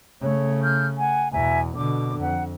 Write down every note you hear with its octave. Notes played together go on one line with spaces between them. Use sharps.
C#3 A3 C#5
F6 G6
F#5 G#5
E2 B2 E5 G#5 A#5
B2 D3 D6
F2 F#5